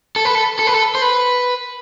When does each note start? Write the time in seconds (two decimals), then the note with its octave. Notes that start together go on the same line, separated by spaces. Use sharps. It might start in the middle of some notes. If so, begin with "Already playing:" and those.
0.16 A4
0.25 B4
0.35 A4
0.59 A4
0.67 B4
0.74 A4
0.95 C5
1.02 B4